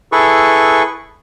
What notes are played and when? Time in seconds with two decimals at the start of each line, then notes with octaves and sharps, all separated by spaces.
0.12 E4 G#4 A4 B4 C#6